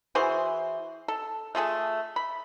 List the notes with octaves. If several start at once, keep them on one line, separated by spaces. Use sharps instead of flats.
E3 F#4 G#4 C5
A4
A3 F4 G#4 A4
B5